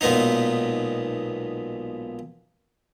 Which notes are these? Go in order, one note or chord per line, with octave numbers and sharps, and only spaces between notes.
B1 A#2 G#3 B3 D#4